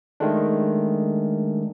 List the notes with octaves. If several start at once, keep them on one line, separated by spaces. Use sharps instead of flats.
D#3 G#3 A3 D4